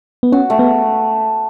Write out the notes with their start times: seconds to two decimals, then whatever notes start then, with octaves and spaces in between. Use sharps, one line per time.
0.23 B3
0.32 C#4 F#4
0.50 A3
0.59 B3